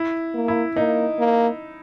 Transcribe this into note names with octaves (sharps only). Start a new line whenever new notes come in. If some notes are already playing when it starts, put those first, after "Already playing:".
Already playing: E4
A#3
E4
A#3 D#4
A#3